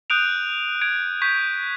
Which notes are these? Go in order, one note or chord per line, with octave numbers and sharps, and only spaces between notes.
D#6 F#6 G6 D7 D#7 F7
G#6 D7 F7
C#6 G6 G#6 B6